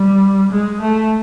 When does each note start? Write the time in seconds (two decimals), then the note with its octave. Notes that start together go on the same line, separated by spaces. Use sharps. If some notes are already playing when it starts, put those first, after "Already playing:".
Already playing: G3
0.51 G#3
0.80 A3